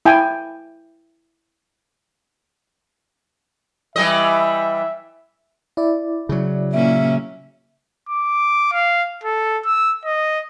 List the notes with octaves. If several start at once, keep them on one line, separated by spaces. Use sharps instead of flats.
E4 G5 G#5
E3 G3 D#5 E5
E4 D5
C#3 F#3
A#2 A#3 C#4 E5
D6
F5
A4
E6
D#5